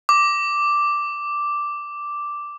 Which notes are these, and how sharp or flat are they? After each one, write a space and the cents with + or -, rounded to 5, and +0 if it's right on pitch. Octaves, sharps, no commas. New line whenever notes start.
D6 +0